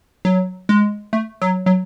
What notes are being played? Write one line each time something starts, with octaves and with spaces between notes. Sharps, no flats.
F#3
G#3
A3
F#3
F#3